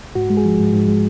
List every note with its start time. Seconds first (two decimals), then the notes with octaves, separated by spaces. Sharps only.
0.15 G#2 F#4
0.30 G#3
0.37 G#4
0.45 F3
0.59 G#2
0.74 G#2
0.88 G#3